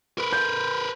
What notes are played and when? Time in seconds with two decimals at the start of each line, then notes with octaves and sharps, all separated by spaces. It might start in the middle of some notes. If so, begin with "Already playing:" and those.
0.18 A#4 B4
0.33 G6